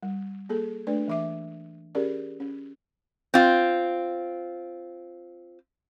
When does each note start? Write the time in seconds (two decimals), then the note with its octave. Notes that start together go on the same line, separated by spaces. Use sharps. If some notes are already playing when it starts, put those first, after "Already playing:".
0.03 G3
0.49 A#3 G#4 A4
0.87 A3 D4 B4 D5
1.08 E3 E5 D6
1.95 C#4 G4 G#4 A#4 D5
2.40 C#4
3.34 C4 F4